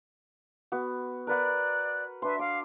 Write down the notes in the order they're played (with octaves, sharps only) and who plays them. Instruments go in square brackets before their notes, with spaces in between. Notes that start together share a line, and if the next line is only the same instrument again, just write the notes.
[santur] B3 F#4
[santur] A#4 B4 F#5 [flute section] D5 F#6
[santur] D4 C6 [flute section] B4 E5
[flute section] F5 [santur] D6